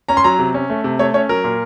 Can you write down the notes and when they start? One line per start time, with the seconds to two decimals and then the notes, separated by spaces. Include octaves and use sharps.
0.09 C#4 A#5
0.17 C6
0.24 F#3 A#5
0.39 C3
0.54 C#4
0.70 A3
0.84 C3
0.99 A3 C#5
1.14 C#4 C#5
1.29 F#3 A#4
1.44 A#2